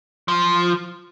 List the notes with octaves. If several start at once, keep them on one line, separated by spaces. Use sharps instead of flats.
F3